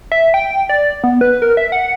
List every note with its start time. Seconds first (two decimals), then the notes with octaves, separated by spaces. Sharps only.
0.12 E5
0.34 G5
0.69 D5
1.04 B3
1.21 B4
1.42 A#4
1.57 E5
1.72 F#5